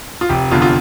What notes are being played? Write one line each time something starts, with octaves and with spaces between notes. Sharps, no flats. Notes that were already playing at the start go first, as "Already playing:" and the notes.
F4
F1 G4
E2 D3 F4
F4